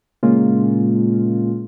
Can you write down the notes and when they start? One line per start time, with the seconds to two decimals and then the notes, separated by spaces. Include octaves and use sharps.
0.23 A#2 C#3 G#3 A#3 C#4 F4